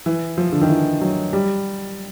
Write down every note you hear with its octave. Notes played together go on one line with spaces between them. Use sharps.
E3
F3
D3
D#3
E3
F#3
G3